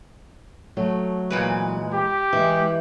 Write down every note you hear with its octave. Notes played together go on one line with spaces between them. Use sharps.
F#3 A3 A4
A#2 E3 G#3 B4
G4
E3 G#3 E4